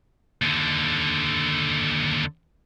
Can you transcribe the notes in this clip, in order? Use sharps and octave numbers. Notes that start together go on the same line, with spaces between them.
D#2 D3